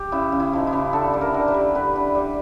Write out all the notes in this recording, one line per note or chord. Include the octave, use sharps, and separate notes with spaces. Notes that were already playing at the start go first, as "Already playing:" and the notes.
Already playing: G4
C#3 E4
C#3
E4
F3 D#4
E4
C#3
D3 A4
G3
A#4
D3
B4
G3
D3 B4
D3
G3